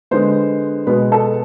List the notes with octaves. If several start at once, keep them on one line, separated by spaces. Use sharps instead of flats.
D3 G#3 B3 C5
B2 G#3 B3 B4
A4